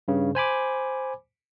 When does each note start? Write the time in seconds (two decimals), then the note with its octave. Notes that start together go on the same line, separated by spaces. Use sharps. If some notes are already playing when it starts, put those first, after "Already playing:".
0.08 G2 C#3
0.35 C5 G#5 B5 D6